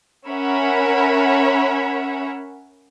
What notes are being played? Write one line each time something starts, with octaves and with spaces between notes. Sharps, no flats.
C#4 A#4 C#5 E5 F#5 B5